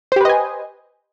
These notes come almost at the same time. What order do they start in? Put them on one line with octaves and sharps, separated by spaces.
C5 G4 B4 D#5 G#5